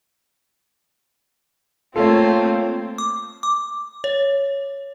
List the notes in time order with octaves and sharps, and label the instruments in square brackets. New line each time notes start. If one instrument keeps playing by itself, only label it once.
[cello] A3 A#3 [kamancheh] C4 [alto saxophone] F4 [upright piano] A4 C#5
[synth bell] D6
D6
C#5